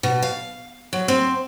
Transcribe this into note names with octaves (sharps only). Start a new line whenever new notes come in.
B2
F5
F#3
C4